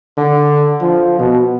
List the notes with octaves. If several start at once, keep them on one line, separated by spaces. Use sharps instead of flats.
D3
F3
B2